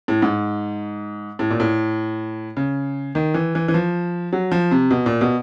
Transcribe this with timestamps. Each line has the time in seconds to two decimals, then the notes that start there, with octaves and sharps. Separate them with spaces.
0.08 A2
0.22 G#2
1.39 A2
1.50 A#2
1.60 A2
2.57 C#3
3.15 D#3
3.34 E3
3.55 E3
3.68 E3
3.74 F3
4.33 F#3
4.52 F3
4.71 C3
4.91 B2
5.06 A#2
5.21 B2